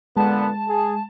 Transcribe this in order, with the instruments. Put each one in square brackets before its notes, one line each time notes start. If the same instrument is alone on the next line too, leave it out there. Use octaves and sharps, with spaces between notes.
[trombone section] A#2 D3 B3 [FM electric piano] G#3 [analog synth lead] A5
[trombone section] G#4